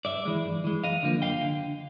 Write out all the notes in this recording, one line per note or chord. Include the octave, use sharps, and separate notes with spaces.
G2 D5 E5
E3 G#3
G2
E3 G#3
F#2 D#5 F5
D3 F3 A#3
F#2 F5 G5
D3